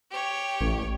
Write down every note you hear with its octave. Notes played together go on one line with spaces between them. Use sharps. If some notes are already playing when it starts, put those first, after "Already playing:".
G4 C#5
A1